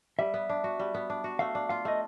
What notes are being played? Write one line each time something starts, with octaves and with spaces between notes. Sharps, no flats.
G3 E5
B3
D4
F#4
G3
B3
D4
F#4
A3 F5
D4
F4 F5
A3 D#5